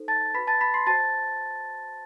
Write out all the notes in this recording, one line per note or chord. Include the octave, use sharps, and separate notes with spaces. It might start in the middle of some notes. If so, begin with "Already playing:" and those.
Already playing: D#4 A4 C5
A5 A6
F#4 B4 B5 B6
A5 A6
B5 B6
C6 C7
F#4 C5 A5 A6